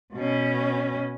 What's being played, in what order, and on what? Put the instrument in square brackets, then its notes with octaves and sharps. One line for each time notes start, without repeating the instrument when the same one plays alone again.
[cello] B2 C#4